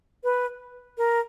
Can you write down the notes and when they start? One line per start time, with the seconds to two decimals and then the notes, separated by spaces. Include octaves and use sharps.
0.24 B4
0.98 A#4